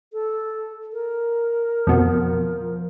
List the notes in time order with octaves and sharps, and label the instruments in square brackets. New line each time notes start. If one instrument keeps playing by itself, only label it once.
[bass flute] A4
A#4
[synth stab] F2 B2 [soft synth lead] F3